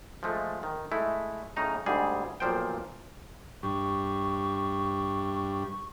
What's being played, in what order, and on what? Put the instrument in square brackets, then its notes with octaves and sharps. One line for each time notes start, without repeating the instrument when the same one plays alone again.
[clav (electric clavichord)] F3 G#3 A3
D#3
G#3 A3 E4
A2 C#3 D#4 A#5
D2 G#2 G3 G#4
B1 A#2 F3 C5 G5
[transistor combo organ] G2 [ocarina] C#6